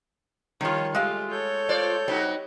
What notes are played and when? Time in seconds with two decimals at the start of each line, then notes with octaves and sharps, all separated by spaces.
0.61 D#3 F3 G3 F4 C#5
0.95 G#3 A3 F4 G4 F5
1.32 A4 C#5 G6
1.69 F4 C5 D5
2.08 G3 C4 D#4 F#4